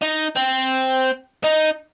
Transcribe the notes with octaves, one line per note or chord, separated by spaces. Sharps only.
D#4
C4
D#4